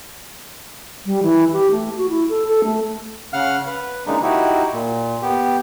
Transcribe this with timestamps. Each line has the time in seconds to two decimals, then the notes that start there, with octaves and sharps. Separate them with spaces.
1.06 G3
1.23 E3
1.53 G4
1.71 A3
1.97 F#4
2.09 E4
2.29 A4
2.48 A4
2.64 A3
3.33 C#3 F5 F#5 F6
3.67 B4
4.06 C#3 E3 G#3 A#3 D4 D#4
4.23 D#4 E4 F#4 G4
4.72 A#2
5.22 B3 G4